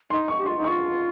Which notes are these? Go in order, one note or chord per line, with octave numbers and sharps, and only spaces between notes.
D#4 C6
C#6
G4
F4 C6
D#4
F4 C#6